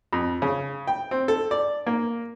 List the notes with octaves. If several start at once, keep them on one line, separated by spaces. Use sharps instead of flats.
F2
C#3
G5
C4
A4
D5
A#3